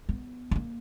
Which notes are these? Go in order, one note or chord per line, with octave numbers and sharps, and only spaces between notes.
B3
G#3
A#3